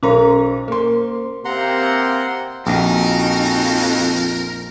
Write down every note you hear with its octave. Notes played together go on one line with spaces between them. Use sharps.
B1 C#4 A#4 C5 A#5
A#3 C6
C3 A#3 C4 F#5 A#5 C6
A#1 F2 D#4 F#4 A#4